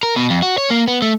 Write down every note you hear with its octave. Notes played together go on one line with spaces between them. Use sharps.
A#4
B2
F2
F#4
C#5
A#3
B3
A3